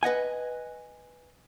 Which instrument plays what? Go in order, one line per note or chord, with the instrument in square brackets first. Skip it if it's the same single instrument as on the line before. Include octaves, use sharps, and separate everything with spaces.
[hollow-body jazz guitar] B4 D#5 F#5 G#5